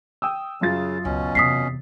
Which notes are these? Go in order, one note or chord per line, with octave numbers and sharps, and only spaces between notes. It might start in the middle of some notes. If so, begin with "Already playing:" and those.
G5 D#6 E6
F#2 C#3 F4 A6
C#2 B2 C#4
E2 C3 D#6 B6 C7